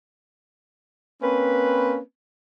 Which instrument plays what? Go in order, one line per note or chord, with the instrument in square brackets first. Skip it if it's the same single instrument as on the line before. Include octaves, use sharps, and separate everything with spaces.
[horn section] A#3 C4 C#4 B4